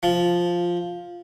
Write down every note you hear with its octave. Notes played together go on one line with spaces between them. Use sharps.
F3